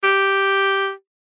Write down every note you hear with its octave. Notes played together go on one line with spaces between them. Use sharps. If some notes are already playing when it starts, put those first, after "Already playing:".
G4